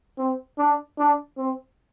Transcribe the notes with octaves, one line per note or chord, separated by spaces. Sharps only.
C4
D4
D4
C4